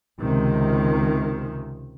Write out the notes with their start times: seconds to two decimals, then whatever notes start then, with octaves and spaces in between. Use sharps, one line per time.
0.20 C#2 C3 D#3